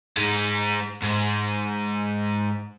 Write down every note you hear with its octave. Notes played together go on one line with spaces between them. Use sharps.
G#2 G#3
G#2